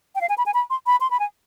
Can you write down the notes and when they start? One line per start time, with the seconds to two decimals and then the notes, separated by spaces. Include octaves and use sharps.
0.15 G5
0.21 F5
0.29 G#5
0.38 B5
0.46 G#5
0.54 B5
0.70 C6
0.86 B5
1.01 C6
1.11 B5
1.19 G#5